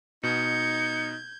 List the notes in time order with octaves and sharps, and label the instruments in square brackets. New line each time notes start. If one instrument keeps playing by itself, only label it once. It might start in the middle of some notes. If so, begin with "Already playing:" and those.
[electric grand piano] B2 [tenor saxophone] D#4 [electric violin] G6 G#6 [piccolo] C#7